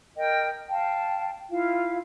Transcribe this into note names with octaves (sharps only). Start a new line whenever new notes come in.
A#4 D#5 G5
F5 G5 A5
E4 F4 F5